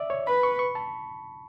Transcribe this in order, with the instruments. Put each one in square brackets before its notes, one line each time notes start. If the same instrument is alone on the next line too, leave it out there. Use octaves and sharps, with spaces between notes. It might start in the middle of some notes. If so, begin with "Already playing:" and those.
Already playing: [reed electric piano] D5 E5
C#5
[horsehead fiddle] B4 [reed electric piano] B5
[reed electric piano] C#6
C#6
A5